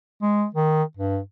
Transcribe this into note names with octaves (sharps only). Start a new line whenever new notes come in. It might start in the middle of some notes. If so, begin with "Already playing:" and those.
G#3
D#3
G2